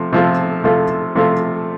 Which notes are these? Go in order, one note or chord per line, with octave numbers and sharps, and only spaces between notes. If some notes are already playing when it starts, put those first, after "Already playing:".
Already playing: C3 F3 A3
C3 F3 A3 F4 A4
C3 F3 A3 F4 A4
C3 F3 A3 F4 A4